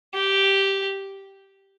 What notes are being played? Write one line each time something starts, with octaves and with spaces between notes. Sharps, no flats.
G4